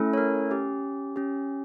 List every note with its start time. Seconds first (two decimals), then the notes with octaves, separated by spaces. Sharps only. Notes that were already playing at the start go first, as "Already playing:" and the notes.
Already playing: A3 C#4 E4 A4
0.13 C#5
0.18 A#4
0.50 C#4 G4
1.16 C#4 G4